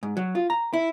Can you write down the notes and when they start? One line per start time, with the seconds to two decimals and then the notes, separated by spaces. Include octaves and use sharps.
0.03 G#2
0.17 F#3
0.35 F4
0.50 A#5
0.73 E4